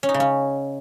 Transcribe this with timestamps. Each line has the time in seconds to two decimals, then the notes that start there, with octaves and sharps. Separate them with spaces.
0.03 C#4
0.09 D#4
0.14 C#3
0.20 C#4